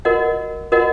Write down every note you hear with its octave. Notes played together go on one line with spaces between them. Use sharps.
F#4 A#4 D#5 F#5
F#4 A#4 D#5 F#5